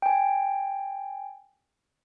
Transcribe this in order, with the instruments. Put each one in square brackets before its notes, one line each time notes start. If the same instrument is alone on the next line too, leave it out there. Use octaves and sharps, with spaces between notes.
[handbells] G5 G#5